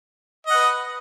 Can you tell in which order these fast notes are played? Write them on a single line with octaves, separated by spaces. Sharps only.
D#5 F#5 B4